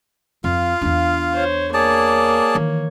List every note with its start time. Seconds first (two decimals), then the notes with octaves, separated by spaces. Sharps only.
0.44 F2 F4 F5
0.81 E2 D4
1.33 C5 C#5
1.74 A#3 G#4 C#5 D5 A5
2.55 D#3 E3